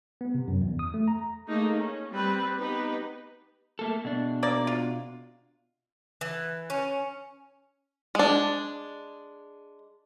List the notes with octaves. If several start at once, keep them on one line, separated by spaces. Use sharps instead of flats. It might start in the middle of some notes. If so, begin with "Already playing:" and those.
B3
C3
F#2
E2
D#6
A3
A#5
A3 A#3 D#4 G#4
C#4
G3 C4 B4
B3 D#4 G4 B4
A3 A#3 A4
B2 D4
A#3 D5
F4
E3
C#4
G#3 D4